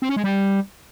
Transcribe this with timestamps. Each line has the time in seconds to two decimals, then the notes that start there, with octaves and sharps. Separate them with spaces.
0.02 C4
0.09 C#4
0.16 G#3
0.24 G3